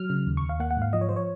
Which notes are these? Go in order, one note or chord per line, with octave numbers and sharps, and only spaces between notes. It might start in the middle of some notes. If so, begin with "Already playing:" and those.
Already playing: F#3 F6
C#3
D#2
C#6
D#2
F5
A#3 F#5
F#5
G#2
F5
F3 D#5
C#5
F3 C5
C#5